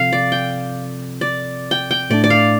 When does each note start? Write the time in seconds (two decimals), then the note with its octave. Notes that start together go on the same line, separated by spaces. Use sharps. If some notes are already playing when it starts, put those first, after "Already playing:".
Already playing: C3 F3 C4 F4 A4 F5
0.13 D5
0.32 G5
1.21 D5
1.71 G5
1.91 G5
2.10 A2 A3 D4 D5
2.24 D5
2.30 F5